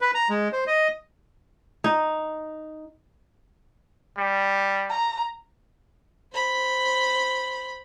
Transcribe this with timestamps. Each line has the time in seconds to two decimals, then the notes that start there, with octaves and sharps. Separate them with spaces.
0.01 B4
0.15 A#5
0.29 G#3
0.53 C5
0.67 D#5
1.84 D#4
4.17 G3
4.90 A#5
6.33 C5 B5